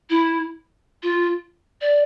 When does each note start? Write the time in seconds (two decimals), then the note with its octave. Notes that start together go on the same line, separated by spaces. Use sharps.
0.10 E4
1.03 F4
1.81 D5